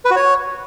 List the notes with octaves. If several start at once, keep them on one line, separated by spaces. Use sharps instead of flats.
B4
F#4
C#5